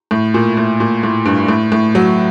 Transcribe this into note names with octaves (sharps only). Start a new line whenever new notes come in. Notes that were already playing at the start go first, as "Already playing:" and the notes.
A2
A#2
A2
A#2
A2
G2
A2
A2
F#3